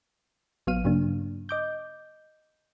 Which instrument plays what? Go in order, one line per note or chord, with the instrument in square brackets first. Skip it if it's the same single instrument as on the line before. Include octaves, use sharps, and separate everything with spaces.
[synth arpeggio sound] A1 F#3 B3 F5 F6 D#7
G2 C#3 F#3 A#3 D4
D#5 D6 G6